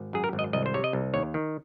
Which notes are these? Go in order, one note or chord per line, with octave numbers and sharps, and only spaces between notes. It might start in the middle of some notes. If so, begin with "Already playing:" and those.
Already playing: G#1
F#2 G#4
A#4
G#1
D#5
C2 D#5
C5
C3 C#5
D#5
C2
D#2 C#5
D#3